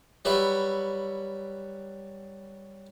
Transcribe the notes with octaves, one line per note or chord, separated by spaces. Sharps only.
F#3 G3 F#4 B4 E5